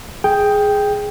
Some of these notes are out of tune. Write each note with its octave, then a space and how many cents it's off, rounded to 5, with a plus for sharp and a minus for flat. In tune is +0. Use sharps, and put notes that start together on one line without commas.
G#4 +0 G5 +5